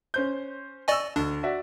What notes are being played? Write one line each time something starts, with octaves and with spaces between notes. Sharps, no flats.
C#4 C5 G6
D5 D#5 G#5 C#6 E6
D2 D4
F#4 D5 E5